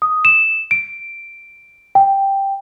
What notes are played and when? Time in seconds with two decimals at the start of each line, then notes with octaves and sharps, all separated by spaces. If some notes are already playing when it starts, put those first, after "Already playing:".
0.02 D#6
0.25 E7
0.71 D7
1.95 G5